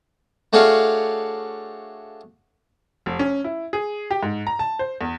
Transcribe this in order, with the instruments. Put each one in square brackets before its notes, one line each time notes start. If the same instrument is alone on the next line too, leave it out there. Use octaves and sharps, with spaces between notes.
[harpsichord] A3 D4 F#4 G#4 C#5 F5
[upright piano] F1
C#4
E4
G#4
G4
G#2
A#5
A5
C5
E2